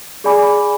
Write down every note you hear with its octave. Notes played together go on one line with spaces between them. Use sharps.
G#4 D5 G#5 B5 D6